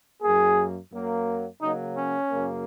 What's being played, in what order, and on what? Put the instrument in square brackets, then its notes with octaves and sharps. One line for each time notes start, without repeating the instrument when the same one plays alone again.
[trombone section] F#2 F#3 A#3 G#4
F#2 F#3 A#3
C#3 F#3 A#3 D#4
C#4
F#2 C#3 A#3